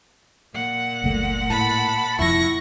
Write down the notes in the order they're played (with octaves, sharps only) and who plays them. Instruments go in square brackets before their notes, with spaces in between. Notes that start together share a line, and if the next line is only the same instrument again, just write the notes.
[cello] A#2 F#5
[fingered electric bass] F#1 C#2 A3
[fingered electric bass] A2 [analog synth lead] A5 [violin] B5
[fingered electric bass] F1 F2 F3 [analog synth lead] E4 [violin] C#6 A#6